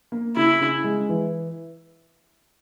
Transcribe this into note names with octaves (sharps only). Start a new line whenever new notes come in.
A#3
C#3 E4
C#3
G#3
E3